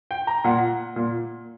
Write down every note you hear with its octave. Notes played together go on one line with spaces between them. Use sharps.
G5
A#5
A#2 F#5
A#2